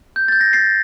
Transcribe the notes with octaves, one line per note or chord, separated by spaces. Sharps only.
G6
G6 A6
A#6
A6 C7